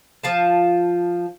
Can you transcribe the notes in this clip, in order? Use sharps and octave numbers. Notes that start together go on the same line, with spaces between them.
F3 F4 F5 A5